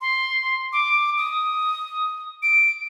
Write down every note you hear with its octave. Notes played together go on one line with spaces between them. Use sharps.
C6
D6
D#6
D7